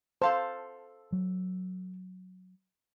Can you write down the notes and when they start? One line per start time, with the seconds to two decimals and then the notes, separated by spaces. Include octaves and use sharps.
0.22 A4 C5 F5 A5
1.12 F#3